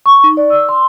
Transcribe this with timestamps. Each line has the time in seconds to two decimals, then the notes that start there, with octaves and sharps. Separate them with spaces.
0.06 C#6
0.24 D#4
0.37 D5
0.50 E6
0.69 C6